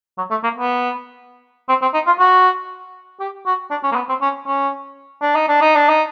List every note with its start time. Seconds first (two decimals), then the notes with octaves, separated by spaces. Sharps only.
0.18 F#3
0.30 A3
0.43 A#3
0.56 B3
1.69 C4
1.82 C4
1.94 D#4
2.06 F4
2.20 F#4
3.20 G4
3.46 F#4
3.71 D4
3.83 C#4
3.92 A#3
3.96 B3
4.09 C4
4.21 C#4
4.46 C#4
5.22 D4
5.35 D#4
5.48 D4
5.61 D#4
5.76 D4
5.89 D#4